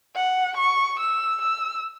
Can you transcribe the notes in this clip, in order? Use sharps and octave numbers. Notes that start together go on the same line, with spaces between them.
F#5
C#6
E6
E6